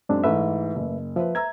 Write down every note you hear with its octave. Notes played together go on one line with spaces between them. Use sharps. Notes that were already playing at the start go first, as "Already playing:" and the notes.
F#2 G#3 C4 D4
G#2 E3 A3 B4 E5
F#1
F3 B4 C5 E5
E5 A#5 E6 G#6